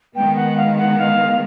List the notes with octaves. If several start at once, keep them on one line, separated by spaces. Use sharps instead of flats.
D#3 G#3 B3 G5
F#5
F5
F#5
F5